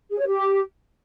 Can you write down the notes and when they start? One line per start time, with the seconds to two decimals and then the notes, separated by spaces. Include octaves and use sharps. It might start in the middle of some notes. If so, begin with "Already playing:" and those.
0.10 G#4
0.19 C#5
0.27 G4